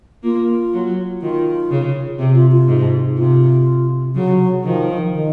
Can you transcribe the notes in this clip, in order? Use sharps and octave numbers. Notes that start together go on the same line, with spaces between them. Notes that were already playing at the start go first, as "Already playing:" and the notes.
A#3 F4
F#3
D#3 F4
C#3
C3
F4
F4
G#2
C3 F4
C#3 F#3
D#3 F3
D#3